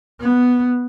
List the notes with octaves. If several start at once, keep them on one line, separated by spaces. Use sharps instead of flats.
B3